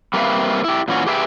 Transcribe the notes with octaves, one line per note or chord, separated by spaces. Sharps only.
G3 A#3 C4 B4 E5 F5
E4 G4
A#2 E3 C#4 F#4
G4 G#4 B4 E5 F5 G5